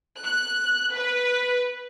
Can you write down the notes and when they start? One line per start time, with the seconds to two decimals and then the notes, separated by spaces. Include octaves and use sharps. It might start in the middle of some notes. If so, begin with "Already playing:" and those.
0.22 F#6
0.93 B4